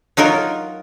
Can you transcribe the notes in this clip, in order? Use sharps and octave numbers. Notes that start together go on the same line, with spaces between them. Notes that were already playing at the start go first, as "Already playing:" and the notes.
F#3 D#4 F4 A#4